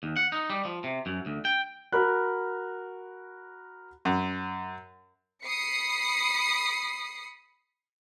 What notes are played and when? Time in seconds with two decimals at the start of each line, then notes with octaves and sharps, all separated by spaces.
0.03 D#2
0.16 F#5
0.32 D#4
0.50 G3
0.65 F3
0.84 C3
1.06 F#2
1.26 D2
1.45 G5
1.92 F#4 A#4 B5 F#6
4.05 F#2
5.44 B5 D#6 C7 C#7